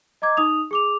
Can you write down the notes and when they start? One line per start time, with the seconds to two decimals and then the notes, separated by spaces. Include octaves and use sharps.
0.22 D#5 A#5 D6 G#6
0.37 D#4 D#6 F7
0.71 G#4 D6 F7